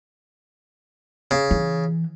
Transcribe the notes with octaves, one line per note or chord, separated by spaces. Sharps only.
C#3
E3